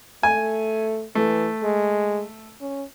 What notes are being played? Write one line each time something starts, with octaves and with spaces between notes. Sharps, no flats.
A3 G#5
E3 A3
G#3
C#4